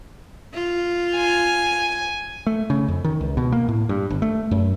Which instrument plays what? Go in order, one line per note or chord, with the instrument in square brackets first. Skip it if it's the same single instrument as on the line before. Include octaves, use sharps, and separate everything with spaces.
[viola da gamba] F4
[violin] G#5
[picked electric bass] A3
C#3
F2
D#3
C#2
B2
A#3
A2
G2
G1
A3
F#2